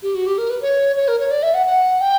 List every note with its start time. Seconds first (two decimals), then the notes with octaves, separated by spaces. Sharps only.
0.02 G4
0.15 F#4
0.26 G4
0.38 A#4
0.50 B4
0.61 C#5
0.96 C#5
1.08 A#4
1.19 C#5
1.31 D5
1.43 E5
1.54 F#5
1.66 F#5
2.01 G5